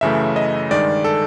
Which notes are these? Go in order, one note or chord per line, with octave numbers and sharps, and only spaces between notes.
F#2 C#3 E3 A3 E5
D#5
G2 D#3 G#3 D5
A4